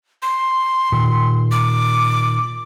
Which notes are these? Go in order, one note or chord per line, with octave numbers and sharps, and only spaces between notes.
C6
A#2 D#3
D6